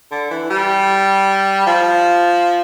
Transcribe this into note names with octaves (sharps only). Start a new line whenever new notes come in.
D3
E3
G3
F3